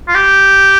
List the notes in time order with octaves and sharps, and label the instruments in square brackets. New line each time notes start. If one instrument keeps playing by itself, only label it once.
[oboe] F4
G4